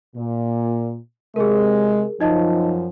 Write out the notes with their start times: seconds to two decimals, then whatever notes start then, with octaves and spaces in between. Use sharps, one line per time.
0.15 A#2
1.36 C3 G#3 G#4 A#4
2.21 F#2 F3 D#4 D#5 A5